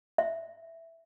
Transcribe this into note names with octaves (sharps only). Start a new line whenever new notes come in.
E5